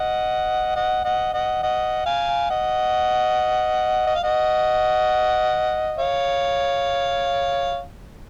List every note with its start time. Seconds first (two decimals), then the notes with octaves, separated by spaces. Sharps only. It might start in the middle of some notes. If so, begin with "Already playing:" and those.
Already playing: D#5 F#5
0.75 D#5 F#5
1.04 D#5 F#5
1.33 D#5 F#5
1.63 D#5 F#5
2.06 F5 G#5
2.50 D#5 F#5
4.07 D#5
4.15 F5
4.24 D#5 F#5
5.98 C#5 F5